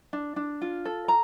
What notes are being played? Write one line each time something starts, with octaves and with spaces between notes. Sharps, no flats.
D4
D4
F4
A4
A#5